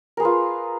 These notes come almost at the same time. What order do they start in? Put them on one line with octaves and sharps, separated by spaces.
A#4 G#4 B4 F4